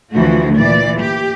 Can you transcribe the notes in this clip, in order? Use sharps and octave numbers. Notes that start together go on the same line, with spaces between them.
D2 E3 F3 A3 F#4
A#2 E3 D5
G4